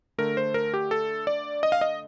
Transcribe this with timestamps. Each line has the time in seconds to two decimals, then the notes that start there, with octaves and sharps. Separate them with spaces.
0.18 D3 A3 A#4
0.37 C5
0.54 A#4
0.74 G4
0.91 A4
1.27 D5
1.63 D#5
1.72 F5
1.81 D#5